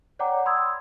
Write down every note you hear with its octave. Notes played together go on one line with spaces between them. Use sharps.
C#5 D5 F#5 G5 A#5 D6
B5 C6 D#6 E6 G#6